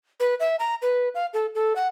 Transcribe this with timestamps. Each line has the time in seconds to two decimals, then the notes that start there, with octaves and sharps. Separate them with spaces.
0.20 B4
0.40 E5
0.59 A#5
0.82 B4
1.15 F5
1.34 A4
1.55 A4
1.76 F#5